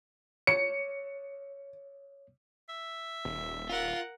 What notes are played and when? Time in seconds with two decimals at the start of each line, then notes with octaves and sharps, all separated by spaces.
0.47 C#5 C#7
2.69 E5
3.25 D#1
3.69 F4 A#4 F#5